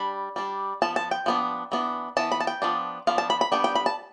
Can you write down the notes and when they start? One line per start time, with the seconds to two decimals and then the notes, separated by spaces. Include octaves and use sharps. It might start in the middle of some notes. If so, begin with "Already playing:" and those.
Already playing: G3 D4 B5
0.36 G3 D4
0.82 F3 B3 A5
0.96 A5
1.11 G5
1.26 F3 B3 D4
1.72 E3 B3 D4
2.17 E3 B3 A5
2.32 B5
2.40 A5
2.47 G5
2.62 F3 B3 D4
3.07 F3 B3 D4 F5
3.18 A5
3.30 B5
3.41 B5
3.52 G3 B3 D4 G5
3.64 G5
3.75 B5
3.86 A5